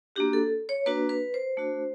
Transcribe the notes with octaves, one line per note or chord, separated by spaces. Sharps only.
A#3 D4 F#4 G4
A4
C#5
A#3 D4 F#4 B4
B4
C5
A3 D4 F#4